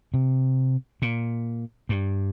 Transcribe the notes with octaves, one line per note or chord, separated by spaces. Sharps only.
C3
A#2
G2